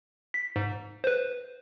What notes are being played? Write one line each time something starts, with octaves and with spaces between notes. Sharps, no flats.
B6
G#2
B4 C5